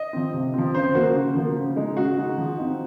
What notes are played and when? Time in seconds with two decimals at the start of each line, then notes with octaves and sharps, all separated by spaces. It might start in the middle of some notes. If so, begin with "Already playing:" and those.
Already playing: D#5
0.13 F3 C4
0.34 C3
0.54 F3 C4
0.74 C#3 C5
0.95 F3 A#3 F#4
1.15 C#3
1.35 F3 A#3
1.56 C#3
1.76 G#3 D#4
1.97 C#3 F#4
2.18 G#3 D#4
2.38 F3
2.58 C4 D#4